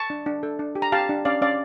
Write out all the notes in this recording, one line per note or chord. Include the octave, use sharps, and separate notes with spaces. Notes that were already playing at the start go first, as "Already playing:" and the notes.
Already playing: A5 C#6
D4
D4
A4
D4
G4
A#5
G4 F5 A5
D4
C#4 D5 F5
C#4 D5 F5